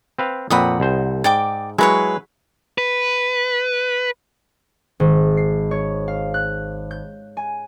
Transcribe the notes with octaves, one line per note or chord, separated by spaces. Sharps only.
C4 B4 F5
F2 A#2 C4 F#5 B5 D#6
C2 C5
G#2 D5 G5 D6
F#3 G#3 E4 G#4 B4 C#5
B4
G#1
C7
C#5
F5
F#6
G6
G#5